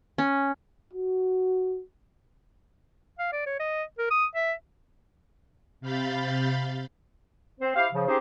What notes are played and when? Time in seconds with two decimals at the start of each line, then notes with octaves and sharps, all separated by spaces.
0.18 C#4
0.93 F#4
3.19 F5
3.32 D5
3.46 C#5
3.60 D#5
3.99 A#4
4.11 D#6
4.35 E5
5.81 C3 F5 B5 G6 A6
7.60 C4 C5
7.76 E4 G4 C5 F5
7.92 C#3 F3
8.07 C4 C#4 D#4 G4 G#4 C5